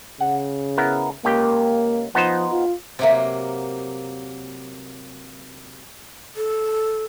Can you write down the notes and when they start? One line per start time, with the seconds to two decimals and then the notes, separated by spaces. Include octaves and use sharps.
0.20 C#3 F#5
0.77 B3 E4 A#4
1.25 C#2 A#3 G4 G5
2.15 F3 B3 D#4 C5
2.52 F4
2.99 C3 F#3 A#3
6.36 A4